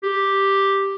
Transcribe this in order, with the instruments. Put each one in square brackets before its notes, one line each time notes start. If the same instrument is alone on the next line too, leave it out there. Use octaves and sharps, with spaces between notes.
[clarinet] G4